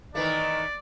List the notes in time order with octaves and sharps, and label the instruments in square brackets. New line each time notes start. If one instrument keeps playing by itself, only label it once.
[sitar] D#3 E3 A3 [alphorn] D#4 [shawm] D5